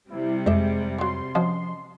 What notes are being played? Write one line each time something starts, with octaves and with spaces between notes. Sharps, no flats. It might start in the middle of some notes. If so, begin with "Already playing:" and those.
C3 G3 E4
F2 G#3 G4 D#5 E5
F3 F#3 C6
F3 C#4 F#4 D#5